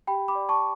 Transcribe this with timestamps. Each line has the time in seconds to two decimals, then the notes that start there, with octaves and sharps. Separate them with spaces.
0.07 G4 G5 B5
0.28 B5 D6
0.35 D5
0.49 A5 C#6